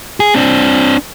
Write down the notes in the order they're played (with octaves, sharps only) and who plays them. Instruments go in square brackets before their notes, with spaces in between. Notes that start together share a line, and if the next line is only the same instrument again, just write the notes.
[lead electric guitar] G#4
C4 D4